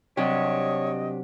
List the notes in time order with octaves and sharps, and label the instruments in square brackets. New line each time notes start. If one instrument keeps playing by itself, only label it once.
[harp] C3 F#3 [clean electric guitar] D4 G4 [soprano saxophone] C#5 [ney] D#5